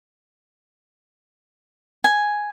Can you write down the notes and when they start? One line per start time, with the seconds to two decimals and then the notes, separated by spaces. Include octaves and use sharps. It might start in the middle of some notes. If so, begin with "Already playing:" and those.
2.04 G#5